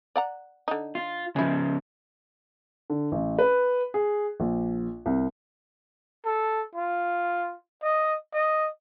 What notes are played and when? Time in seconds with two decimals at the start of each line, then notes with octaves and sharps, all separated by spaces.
0.16 D5 F#5 A#5
0.68 D3 D#4
0.95 F4
1.36 C#3 F3 G#3 E4
2.90 D3
3.12 A1
3.39 B4
3.94 G#4
4.40 A#1
5.06 C2
6.25 A4
6.76 F4
7.83 D#5
8.34 D#5